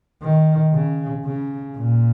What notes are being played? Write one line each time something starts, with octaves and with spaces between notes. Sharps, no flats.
D#3
C#3
C#3
A#2